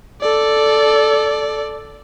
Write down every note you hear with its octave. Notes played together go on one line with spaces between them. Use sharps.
A4 D5